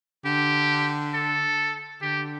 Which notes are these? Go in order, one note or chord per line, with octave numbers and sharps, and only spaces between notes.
D3 G4
A4
D3 G4